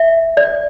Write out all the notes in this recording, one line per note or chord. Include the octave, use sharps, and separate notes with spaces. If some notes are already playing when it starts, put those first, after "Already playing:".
Already playing: E5
D5